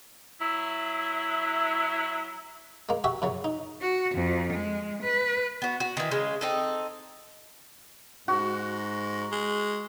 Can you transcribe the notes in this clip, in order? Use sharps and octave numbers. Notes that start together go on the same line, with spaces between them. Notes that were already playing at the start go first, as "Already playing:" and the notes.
F#3 E4
G#3 A#3
F#4 G4 E5
F#2 C#3 F#3
D#4
F#4
F2
G#3
B4
B3 F#4
F#4
D#3 E3
C#3 G#3
C4 D#4 A4
G#2 F#4
G#3